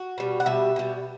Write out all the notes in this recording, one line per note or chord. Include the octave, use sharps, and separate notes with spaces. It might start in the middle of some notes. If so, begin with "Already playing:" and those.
Already playing: F#4
B2 G3
F#5
B2 G3 E5
B2 G3